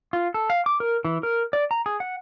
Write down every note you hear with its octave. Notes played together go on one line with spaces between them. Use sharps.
F4
A4
F5
D6
A#4
E3
A#4
D5
A#5
G#4
F#5